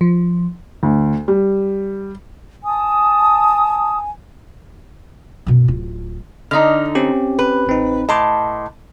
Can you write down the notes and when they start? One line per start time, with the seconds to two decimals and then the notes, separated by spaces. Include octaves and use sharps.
0.01 F3
0.83 D2
1.28 G3
2.64 G#5 A5 D#6
5.47 F#2 B2
5.68 D1 F4
6.51 D3 D#4 D#5 F6
6.95 C4 C#4 G4
7.39 B4
7.67 A1 C4 D#4
8.09 A2 D#5 A5 C6 D6